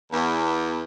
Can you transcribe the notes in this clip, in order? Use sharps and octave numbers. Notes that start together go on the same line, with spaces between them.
E2